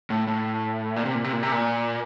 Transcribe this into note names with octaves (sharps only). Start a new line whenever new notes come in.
A2
A2
A#2
C3
A#2
C3
A#2
C3
A#2